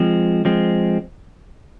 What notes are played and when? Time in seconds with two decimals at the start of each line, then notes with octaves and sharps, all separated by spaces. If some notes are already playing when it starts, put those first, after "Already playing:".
Already playing: F3 G#3 C4
0.45 F3 G#3 C4